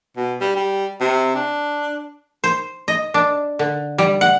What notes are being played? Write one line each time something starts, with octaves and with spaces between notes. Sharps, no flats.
B2
G3
G3
C3
D4
C5
D#5
D4
D3
G3
F#5